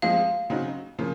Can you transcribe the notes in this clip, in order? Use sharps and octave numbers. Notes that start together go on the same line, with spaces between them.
F3 G#3 C4 F5
C#3 F#3 C4 D#4 F#4
C#3 F3 A#3